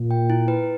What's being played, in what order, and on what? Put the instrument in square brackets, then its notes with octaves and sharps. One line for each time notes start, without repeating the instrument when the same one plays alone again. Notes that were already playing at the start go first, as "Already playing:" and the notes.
Already playing: [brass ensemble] A#2
[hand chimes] G5
E4
B4